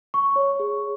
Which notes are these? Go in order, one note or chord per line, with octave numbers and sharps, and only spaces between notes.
C#6
C#5
G#4